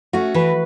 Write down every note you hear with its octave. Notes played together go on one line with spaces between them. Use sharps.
A3 C#4 F#4
E3 B4